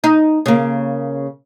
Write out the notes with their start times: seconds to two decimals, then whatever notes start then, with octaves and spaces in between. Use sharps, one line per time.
0.04 D#4
0.46 C#3 A#3